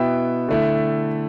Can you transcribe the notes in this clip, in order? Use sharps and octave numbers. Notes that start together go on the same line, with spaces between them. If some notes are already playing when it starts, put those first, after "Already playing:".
Already playing: B2 B3 E4 E5 G5
D3 A3 E4